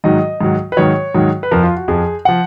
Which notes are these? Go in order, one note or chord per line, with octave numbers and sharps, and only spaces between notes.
G#2 D#3 F#3 D#5
G#2 D#3 F#3
B4
G#2 D#3 F#3 C#5
G#2 D#3 F#3
B4
F2 F3 A#4
F4
F#4
F2 F3 G#4
F3 F#5